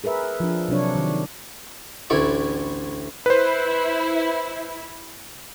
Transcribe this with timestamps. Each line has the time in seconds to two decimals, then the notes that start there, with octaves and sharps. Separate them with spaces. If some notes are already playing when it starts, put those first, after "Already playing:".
0.04 G#4 A#4 B4 E5
0.40 F3 D4
0.68 C3 F#3 D4 C#5
0.95 D#3
2.10 A1 D2 E4 C#5 D5
3.26 E4 B4 C5